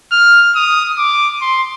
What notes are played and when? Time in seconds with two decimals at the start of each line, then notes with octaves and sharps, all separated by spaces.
0.11 F6
0.55 D#6
0.98 D6
1.41 C6